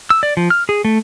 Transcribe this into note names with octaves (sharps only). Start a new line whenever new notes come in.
E6
D5
F3
F6
G#4
A3